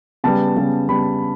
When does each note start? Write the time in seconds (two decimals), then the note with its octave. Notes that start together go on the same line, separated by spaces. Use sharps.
0.24 C#3 G3 B3 A5
0.56 C#3 G3 B3
0.89 C#3 G3 B3 B5